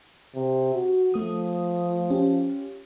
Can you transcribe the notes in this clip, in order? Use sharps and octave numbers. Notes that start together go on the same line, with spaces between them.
C3
F#4
F3 A3 D#6
C#4 F4 G4